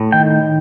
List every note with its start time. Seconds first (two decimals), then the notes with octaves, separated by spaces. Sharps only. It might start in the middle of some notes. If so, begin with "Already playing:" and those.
Already playing: A2
0.12 D#3 G5